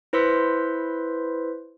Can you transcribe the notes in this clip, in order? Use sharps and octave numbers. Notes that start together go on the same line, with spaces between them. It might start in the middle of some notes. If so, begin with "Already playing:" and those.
E4 B4 C5 C6 E6 B6